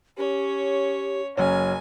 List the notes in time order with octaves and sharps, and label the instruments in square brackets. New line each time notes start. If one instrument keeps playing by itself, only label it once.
[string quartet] C#4 C#5 [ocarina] G4
[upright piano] F#1 F#3 C#4 [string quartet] G#5